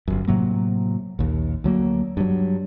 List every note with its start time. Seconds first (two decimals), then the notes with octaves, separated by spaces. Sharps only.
0.08 G1 F#2
0.28 A2 C3 F#3 A#3
1.19 A#1 D#2
1.64 D2 F#3 A#3
2.17 G2 F#3